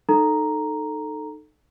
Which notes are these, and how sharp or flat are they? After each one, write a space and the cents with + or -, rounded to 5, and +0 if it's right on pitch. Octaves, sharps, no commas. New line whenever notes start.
D#4 -20 A4 +0 A#5 +0